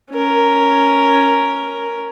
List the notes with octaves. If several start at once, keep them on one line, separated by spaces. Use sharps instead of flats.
C#4 A#4